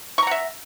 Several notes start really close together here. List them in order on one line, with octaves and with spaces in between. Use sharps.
C#6 A#5 F#5 E5